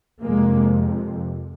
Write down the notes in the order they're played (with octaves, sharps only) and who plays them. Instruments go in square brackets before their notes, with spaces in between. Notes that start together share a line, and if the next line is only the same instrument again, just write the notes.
[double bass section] F2 C3 G#3 A#3